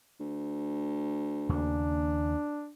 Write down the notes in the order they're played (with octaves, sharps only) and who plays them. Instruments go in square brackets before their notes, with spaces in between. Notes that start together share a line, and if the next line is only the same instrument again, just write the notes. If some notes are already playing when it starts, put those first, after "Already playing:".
[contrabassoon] D2
[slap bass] D#2 C#3 A#3 [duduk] D4